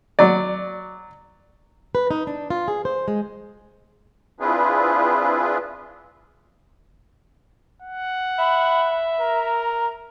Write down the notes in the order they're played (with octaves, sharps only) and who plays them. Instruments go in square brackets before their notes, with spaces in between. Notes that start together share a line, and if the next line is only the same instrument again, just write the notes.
[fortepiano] F#3 D5
[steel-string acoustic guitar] B4
D#4
D4
F4
G#4
C5
G#3
[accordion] C4 D4 E4 F4 G#4 B4
[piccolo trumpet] F#5
[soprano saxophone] E5 [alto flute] B5
[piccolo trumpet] A#4 [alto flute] A#5